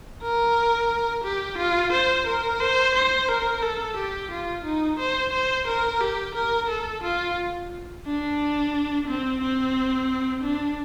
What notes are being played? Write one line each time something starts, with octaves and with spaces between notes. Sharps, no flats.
A#4
G4
F4
C5
A#4
C5
C5
A#4
A4
G4
F4
D#4
C5
C5
A#4
G4
A#4
A4
F4
D4
C4
C4
D4